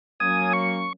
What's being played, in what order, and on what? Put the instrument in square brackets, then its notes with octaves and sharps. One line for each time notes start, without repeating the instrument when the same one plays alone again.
[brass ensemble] F#3 A#3 C#4 [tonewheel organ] G#5 D#6
[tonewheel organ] C#6